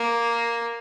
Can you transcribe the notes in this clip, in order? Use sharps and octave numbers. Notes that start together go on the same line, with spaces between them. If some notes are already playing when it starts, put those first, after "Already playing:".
Already playing: A#3